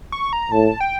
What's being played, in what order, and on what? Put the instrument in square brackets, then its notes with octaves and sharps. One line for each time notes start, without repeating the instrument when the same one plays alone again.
[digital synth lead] C#6
A#5
[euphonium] A2 [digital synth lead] A5
[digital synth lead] G5